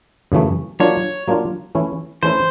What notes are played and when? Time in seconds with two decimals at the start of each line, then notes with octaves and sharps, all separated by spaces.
0.32 F#2 C#3 E3 A3
0.80 F#3 A#3 D4 F4 C#5
1.28 F#3 A#3 D4 F4
1.75 E3 A3 C#4 E4
2.23 E3 A3 C#4 E4 C5